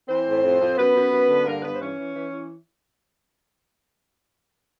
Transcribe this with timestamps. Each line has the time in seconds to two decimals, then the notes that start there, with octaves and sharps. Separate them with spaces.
0.08 E3 C4 C5
0.26 A2
0.43 F2
0.60 F2
0.77 F#2 B3 B4
0.95 F#2
1.11 F#2
1.29 D3
1.46 G2 A#3 A#4
1.63 G2 B3 B4
1.75 C5
1.80 E3 C#4 C#5
1.98 E3
2.15 E3
2.32 E3